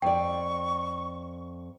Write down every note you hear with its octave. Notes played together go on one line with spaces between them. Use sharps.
F2 D5 G5 C#6